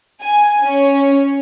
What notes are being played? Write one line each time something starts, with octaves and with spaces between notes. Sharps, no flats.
G#5
C#4